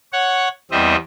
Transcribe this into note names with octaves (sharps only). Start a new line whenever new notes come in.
C#5 F#5
E2 G3 C4 D#5 E5